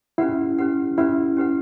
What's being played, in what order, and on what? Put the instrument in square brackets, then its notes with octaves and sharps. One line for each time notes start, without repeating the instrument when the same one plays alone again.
[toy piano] C#4 G4 B4 F#5 [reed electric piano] E4
[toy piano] C#4 G4 B4 F#5
[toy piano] C#4 G4 B4 F#5 [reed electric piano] E4
[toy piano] C#4 G4 B4 F#5